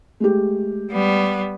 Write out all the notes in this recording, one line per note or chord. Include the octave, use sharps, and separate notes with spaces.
G#3 A3 G4
G3 B3